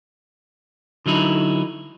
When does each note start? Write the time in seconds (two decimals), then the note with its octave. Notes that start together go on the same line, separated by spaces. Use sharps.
1.06 D3 F#3 D#4 E4